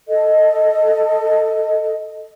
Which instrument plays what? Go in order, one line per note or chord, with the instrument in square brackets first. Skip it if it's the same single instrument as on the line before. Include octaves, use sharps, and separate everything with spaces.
[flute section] A4 D#5